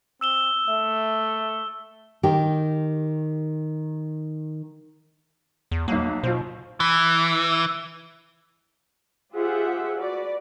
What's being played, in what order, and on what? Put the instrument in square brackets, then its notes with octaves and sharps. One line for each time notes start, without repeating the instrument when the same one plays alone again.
[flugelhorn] C4 [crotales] E6 E7 G7
[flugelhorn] A3 [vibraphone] E5
[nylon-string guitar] D#3 G4
[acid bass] E2
[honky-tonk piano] B1 F#3 [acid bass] A#3
[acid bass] B2 [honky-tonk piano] F4 C5
[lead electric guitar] E3
[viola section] F4 G4 G#4 C5 E5 F#5
F#4 B4 D5